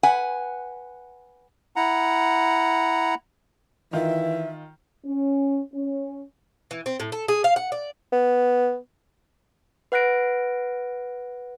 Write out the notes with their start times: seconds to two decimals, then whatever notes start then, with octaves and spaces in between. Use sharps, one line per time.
0.03 B4 F#5 G#5
1.76 E4 F#5 A#5
3.93 D#3 E3 F4 E5
5.05 C#4
5.74 C#4
6.71 E3
6.86 C4
7.00 A2
7.12 A4
7.28 G#4
7.44 F5
7.56 F#5
7.72 D5
8.13 B3
9.92 B4 F#5 F#6 A#6 D7